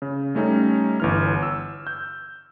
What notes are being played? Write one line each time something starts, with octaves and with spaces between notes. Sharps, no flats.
C#3
G3 A3 C#4 D#4
G1 E3 F6
E6
G6